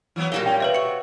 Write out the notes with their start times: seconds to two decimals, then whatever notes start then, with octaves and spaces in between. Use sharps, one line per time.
0.16 E3 F#3 B3
0.32 A#2 G3 A#3 F#4 G4 G7
0.46 C#4 G5
0.60 C3 B4 C#5 E5
0.74 F#4 C#7 F#7